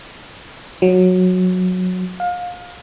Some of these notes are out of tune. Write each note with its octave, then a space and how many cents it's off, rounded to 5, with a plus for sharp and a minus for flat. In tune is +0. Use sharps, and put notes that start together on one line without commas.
F#3 -15
F5 +30